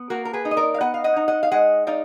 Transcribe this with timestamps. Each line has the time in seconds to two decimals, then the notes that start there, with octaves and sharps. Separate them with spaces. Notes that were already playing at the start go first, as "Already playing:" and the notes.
Already playing: B3
0.10 A#3 F#4 A#4
0.25 A#4
0.33 G#4 B4
0.45 D#4
0.51 D#5
0.57 A#4 D5
0.74 F5
0.81 B3 D#5 F#5
0.94 F5
1.04 D#5 F#5
1.16 D#4
1.28 D#5 F#5
1.43 F5
1.52 G#3 D#5 F#5
1.87 D#4 D5 F5